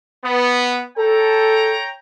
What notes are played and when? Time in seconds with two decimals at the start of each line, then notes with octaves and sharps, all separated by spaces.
0.23 B3
0.98 A4 C#5 G5 A#5